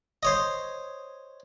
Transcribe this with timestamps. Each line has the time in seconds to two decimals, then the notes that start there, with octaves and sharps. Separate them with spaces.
0.23 C5 C#5 D#5